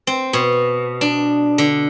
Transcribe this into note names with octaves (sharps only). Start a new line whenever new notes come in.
C4
B2
D4
D3